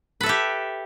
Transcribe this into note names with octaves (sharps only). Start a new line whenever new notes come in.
G4 A4 B4 E5